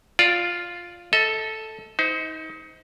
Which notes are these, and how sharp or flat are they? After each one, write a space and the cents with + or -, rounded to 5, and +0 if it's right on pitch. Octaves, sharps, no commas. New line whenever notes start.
F4 +0 D5 +0 F5 -30
A4 +0 D#5 +40
D#4 +30 C5 -20